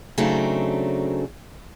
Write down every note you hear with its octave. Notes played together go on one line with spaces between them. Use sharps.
C#3 F#3 A3 C4 D4 D#4